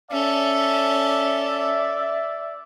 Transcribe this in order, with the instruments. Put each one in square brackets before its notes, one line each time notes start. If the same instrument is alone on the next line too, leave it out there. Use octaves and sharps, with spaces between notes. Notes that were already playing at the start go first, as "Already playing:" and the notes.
[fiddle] C#4 A4 [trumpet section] D5 E5